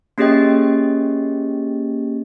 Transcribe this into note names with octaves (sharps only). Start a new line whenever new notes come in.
A#3 C#4 G4 G#4 D#5 G5